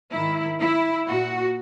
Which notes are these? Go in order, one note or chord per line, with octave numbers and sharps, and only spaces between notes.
G#2 D#3 E4
E4
A#2 F#4